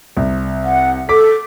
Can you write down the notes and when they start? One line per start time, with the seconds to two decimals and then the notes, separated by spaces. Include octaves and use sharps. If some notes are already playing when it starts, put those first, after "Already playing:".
0.17 C2
0.64 F#5
1.09 A4 D6 B6